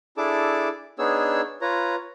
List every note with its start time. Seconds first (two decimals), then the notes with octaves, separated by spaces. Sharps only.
0.17 D4 E4 G#4 A4 A5 D6
0.99 B3 D4 D#4 G#4 C#5 E6
1.61 F4 B4 C#5 A#5